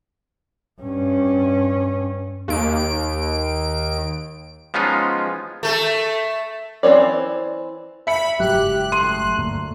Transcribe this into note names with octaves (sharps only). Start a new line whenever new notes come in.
G2 C#4
D#2 D7
F3 G#3 B3 C#4 D#4 F4
A3 A4
E3 C4 A4 C#5 D5
E5 B5 C#7
F#1 G#2 F#3 G4 F#6
A3 C6 D#7
D2 G2 A#3